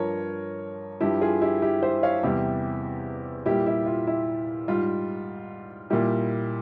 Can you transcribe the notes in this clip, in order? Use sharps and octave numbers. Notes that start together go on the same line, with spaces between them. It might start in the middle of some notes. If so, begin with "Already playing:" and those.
Already playing: G2 F3 A#4 C#5
G2 F3 E4 G4
F4 G#4
E4 G4
E4 G4
C5 E5
C#5 F5
E2 C3 G3 E4 G4
A#2 G3 E4 G4
E4 G4
F4
E4
G#2 G3 F4
A#2 G3 E4 G4